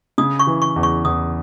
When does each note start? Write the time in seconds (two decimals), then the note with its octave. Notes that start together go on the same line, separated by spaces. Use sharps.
0.18 C#3 D#6
0.39 C#6
0.47 E3
0.62 C#6
0.76 E2
0.83 C#6
1.05 E2 D#6